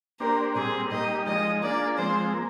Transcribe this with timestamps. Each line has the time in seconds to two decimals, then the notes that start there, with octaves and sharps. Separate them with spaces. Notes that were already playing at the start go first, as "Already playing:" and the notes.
0.20 A#3 D4 G4 A#4 C5
0.55 A#2 G3 C4 G#4
0.91 G3 A#3 D#4 G4 D#5
1.26 F3 G#3 D#4 D#5
1.62 A#3 D4 F4 G#4 D5
1.98 F3 G#3 C4 C5
2.34 A#3